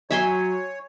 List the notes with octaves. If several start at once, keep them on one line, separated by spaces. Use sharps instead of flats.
F#3 C#5 E5 G#5 C6